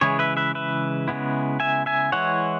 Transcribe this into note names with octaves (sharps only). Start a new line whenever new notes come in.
C#3 E3 G#3 E4 G#4 C#5
B4 E5
B4 E5
B4 E5
C#3 G#3 B3 E4
E5 G#5
E5 G#5
E3 G#3 E4 C#5 F#5